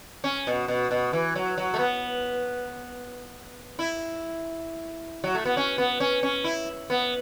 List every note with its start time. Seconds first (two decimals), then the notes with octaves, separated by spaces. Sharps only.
0.24 C#4
0.47 B2
0.68 B2
0.91 B2
1.13 E3
1.35 F#3
1.58 F#3
1.74 A3
1.79 B3
3.79 E4
5.24 F#3
5.35 A3
5.45 B3
5.57 C#4
5.78 B3
6.00 C#4
6.23 C#4
6.44 E4
6.90 B3